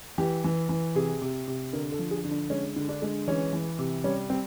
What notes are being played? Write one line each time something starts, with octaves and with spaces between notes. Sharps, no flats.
E3 G4
E3
E3
C3 G#4
C3
C3
D3 A#4
A4
F3
G#4
D3
D4
G#3 C#4
D3
D4
G#3
E3 C#4
E3
C3
G3 C#4
G3 C4